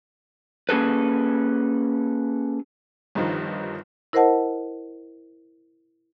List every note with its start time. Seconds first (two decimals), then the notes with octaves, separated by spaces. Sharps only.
0.69 A#3 C#4 G#4 A4 B4
3.15 G1 G2 D#3 F3
4.13 E4 A#4 C5 D#5 F#5 A5